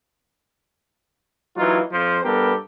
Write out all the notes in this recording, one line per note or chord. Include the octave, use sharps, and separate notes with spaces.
E3 F#3 A#3 D#4 F4
F2 F3 C5
G2 B3 G4 A4 A#4